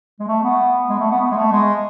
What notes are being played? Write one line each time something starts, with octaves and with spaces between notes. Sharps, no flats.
G#3
A3
B3
G#3
A3
B3
B3
G#3
A3
G#3